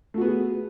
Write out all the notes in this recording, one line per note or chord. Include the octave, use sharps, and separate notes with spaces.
A3 B3 F#4 G#4